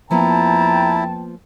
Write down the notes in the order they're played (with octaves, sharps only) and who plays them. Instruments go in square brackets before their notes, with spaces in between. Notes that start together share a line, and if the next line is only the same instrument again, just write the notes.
[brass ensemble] F2 G5 A5 [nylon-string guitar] F3 A#3 B3 [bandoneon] E4 [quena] A#5